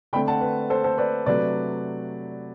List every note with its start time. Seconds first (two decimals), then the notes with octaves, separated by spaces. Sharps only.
0.13 D3 A3 C4 G5 B5
0.27 F#5 A5
0.41 B4
0.70 A4 C5
0.84 A4 C5
0.98 B4 D5
1.26 C3 F#3 A3 D4 B4 D5